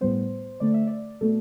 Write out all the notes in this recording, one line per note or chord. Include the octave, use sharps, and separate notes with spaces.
A2 G3 B3 C5
D3 A3 D5
E5
D5
B2 A3 A4